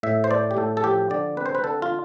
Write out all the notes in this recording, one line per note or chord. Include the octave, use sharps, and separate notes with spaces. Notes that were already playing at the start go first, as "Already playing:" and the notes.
A2 E5
C5
A3 D5
G4
A2 A4
A4
F3 G4
D3 D5
C4 B4
C5
B4
D3 A4
F4